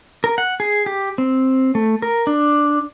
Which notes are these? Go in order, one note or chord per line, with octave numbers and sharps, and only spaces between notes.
A#4
F#5
G#4
G4
C4
A3
A#4
D4